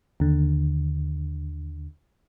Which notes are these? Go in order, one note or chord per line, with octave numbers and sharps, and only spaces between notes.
D#2 D3